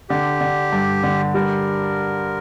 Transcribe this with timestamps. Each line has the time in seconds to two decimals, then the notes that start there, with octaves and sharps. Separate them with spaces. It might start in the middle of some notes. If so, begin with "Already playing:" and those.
0.10 D3 G4
0.41 D3
0.72 G2
1.03 D3
1.34 G3 A#4